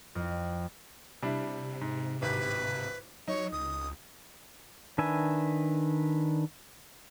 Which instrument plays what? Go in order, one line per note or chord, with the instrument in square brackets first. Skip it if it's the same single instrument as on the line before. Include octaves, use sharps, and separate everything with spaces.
[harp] F2
[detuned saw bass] C3 [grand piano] G3 D4 E4
[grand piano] G#2
[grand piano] D1 G#1 G4 [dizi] B4
[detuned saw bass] F#3 [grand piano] D#4 [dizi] C#5
[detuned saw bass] C#2 [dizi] D#6
[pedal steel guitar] D#3 D4 B4 E5 G#5